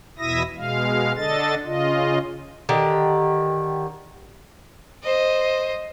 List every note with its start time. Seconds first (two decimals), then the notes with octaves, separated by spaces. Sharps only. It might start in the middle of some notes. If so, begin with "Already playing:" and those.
0.18 E2 B2 E4 E5 D#6 A#6
0.56 B2 G#3 F5
1.16 D3 D4 A4 D#5 A6
1.65 C#3 F4 D#5
2.69 D3 D#3 G4
5.03 C5 D#5